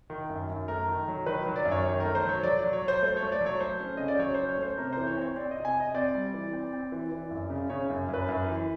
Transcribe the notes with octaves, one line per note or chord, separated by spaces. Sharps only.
D#3
F#2
F#2
A3 A#4
D#3
F#3
D#3 B4
F#3
D5
F#2
C#5
D#3 C#5
A3 A#4
C5
F#3 C#5
F#3 D5
D5
F#3
C#5
F#3
C5
A3 C5
C#5
A3
D5
F#3
C#5
A3 C5
C#4
C#3 D#5
D5
F#3 C#5
C#4 C5
C#5
A3 C5
C3 A#4
E3 C5
C#5
C4 C#5
C4 D5
C3 D#5
G#5
C3 D#5
C4 D5
G3
E3
C4
C4
E3
E3
F#2
C#3
C#3 C#5
F#2
F#2 B4
F#2
E3